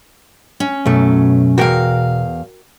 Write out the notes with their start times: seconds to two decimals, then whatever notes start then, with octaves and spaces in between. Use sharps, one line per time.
0.60 C#4
0.86 F#2 B2 A3
1.58 E2 F#4 A#4 F5 G5